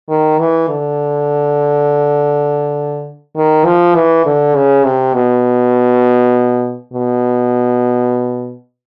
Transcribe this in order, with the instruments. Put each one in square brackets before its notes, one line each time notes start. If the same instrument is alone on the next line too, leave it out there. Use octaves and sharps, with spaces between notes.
[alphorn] D#3
E3
D3
D#3
F3
E3
D3
C#3
C3
B2
B2